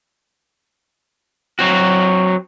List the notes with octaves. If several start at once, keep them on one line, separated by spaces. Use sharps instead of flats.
F#3 C4 F#4